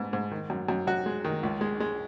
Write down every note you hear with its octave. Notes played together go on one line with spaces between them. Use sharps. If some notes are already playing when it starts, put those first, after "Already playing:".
Already playing: G#2 B3
G#2
D#3
F#2
F#2
F#2 F#4
G#3
D#3
C#2
G#3
G#3